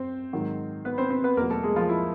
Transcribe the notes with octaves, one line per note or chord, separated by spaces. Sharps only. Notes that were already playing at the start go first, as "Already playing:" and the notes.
Already playing: F#2 C4 C5
G#2 D#3 F#3
B3 B4
C4 C5
C4 C5
B3 B4
E2 B2 F#3 A#3 A#4
A3 A4
G#3 G#4
F3 F4
E4